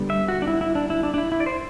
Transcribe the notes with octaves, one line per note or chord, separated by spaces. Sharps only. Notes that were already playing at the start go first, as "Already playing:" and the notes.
Already playing: D3 G3 B3
E5
F#4
D4
E4
E4
D4
E4
D4
D4
E4
E4
D5
C5